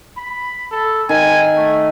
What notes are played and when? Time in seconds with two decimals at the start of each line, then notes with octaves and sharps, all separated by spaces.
0.17 B5
0.71 A4
1.09 D#3 G#5
1.56 A3